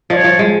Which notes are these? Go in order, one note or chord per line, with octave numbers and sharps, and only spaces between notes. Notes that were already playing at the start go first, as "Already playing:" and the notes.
F3 C#5 D#5
F3
G#3